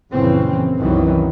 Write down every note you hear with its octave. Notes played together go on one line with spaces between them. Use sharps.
A#1 F#2 C#3 E3 C4
C2 F#2 D#3 E3 F#3